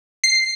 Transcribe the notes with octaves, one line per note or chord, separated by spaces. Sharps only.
C7